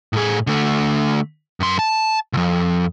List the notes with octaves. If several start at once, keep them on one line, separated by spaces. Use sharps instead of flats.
A2 G#4
D3 A3
F#2 C6
A5
C2 F2